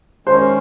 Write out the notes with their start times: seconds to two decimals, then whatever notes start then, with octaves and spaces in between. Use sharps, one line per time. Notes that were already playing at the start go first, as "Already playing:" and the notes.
0.26 D#3 G#3 C#4 C5